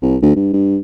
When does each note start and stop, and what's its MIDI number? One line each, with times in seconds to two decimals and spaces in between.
0.02 0.16 36
0.22 0.35 38
0.36 0.50 43
0.53 0.78 43